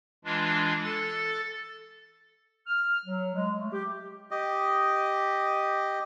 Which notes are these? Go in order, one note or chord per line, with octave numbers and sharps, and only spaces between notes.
E3 G#3 D4 F4
A4 A6
F6
F#3
G#3
A3
G4
G4 D#5